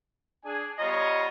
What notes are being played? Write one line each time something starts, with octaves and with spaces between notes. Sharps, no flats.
D4 G#4 G#5
G3 B3 F4 C#5 D#5 A#5